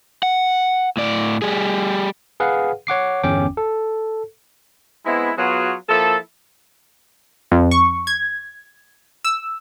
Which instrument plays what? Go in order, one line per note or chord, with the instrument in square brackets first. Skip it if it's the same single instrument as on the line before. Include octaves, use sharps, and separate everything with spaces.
[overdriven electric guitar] F#5
A2 D5
G3 G#4
[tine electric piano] G#4 B4 F5 F#5
C#5 F#5 D6 C7
G1 E2 C#4 G5 D6
A4
[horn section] G#3 B3 C4 E4
F#3 B3 F4 F#4 G#4
F3 A#3 E4 A4
[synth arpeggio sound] F2
C#6
G#6
E6